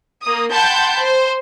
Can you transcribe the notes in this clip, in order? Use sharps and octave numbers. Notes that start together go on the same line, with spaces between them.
A#3 D#6
F#5 G5 A5 B5 C6 G6
C5